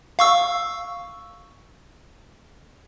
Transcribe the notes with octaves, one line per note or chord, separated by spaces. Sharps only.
F5 C#6 E6